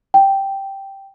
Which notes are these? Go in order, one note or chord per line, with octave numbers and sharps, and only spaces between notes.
G5